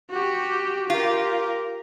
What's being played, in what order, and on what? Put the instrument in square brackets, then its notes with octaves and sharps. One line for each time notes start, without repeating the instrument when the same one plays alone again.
[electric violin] F#4 G4
[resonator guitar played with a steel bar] F4 [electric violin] G4 A#4